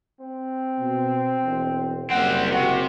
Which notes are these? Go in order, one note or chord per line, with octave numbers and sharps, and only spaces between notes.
C4
B2
E1
F#1 G3 C4 F#5
C3 F#4